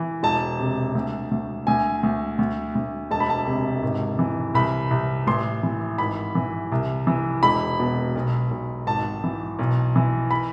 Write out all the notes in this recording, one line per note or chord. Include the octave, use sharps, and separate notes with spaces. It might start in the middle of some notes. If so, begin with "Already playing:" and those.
Already playing: E3
E1 A5
C3
D2
D2
D2 G#5
D2
D2
D2
E1 A5
B5
A5
C3
G#1
E3
C2 B5
C2
A1 C6
E3
G#1 B5
E3
C2
E3
E1 B5
B2
B1
B1
G#1 A5
E3
B1
E3
B5